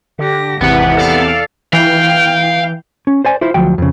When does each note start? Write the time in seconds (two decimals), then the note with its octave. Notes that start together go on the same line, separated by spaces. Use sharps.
0.19 D3 G4 A#6
0.61 G#1 E2 C3 E3 B3 B4 F#5
0.97 A4 D5 F5
1.73 E3 F5 G5
3.07 C#4
3.25 C5 D5 G#5
3.41 E4 F4 C5
3.54 D2 F3 F#3 G5
3.78 F2 C#3